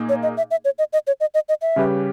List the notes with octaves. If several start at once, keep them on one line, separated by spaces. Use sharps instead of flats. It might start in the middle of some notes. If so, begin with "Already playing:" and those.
Already playing: A#2 A#3 D#4 G#4
C#5
D#5
E5
E5
C#5
D#5
D#5
C#5
D#5
D#5
D#5
E5
C#3 G3 C#4 G4 B4